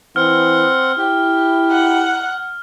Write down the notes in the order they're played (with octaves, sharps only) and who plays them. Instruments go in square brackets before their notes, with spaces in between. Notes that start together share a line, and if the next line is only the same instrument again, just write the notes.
[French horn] E3 [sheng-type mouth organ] C4 F#5 [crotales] F6
[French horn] E4 [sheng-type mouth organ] G4
[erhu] F#5